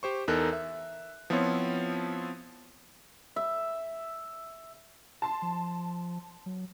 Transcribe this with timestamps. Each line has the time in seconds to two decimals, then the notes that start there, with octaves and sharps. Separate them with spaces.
0.03 G4 C5 C#6
0.28 E2 D#4 A4 A#4 F#6
0.53 E5
1.30 F3 B3 C4 E4 F4 C#5
3.36 E5
5.22 A5 C6
5.42 F3
6.46 F#3